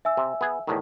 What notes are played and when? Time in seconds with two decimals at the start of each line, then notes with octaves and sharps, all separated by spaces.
0.05 E5 G#5 E6
0.17 C3
0.41 B3 G#4
0.67 E2 A2 D#3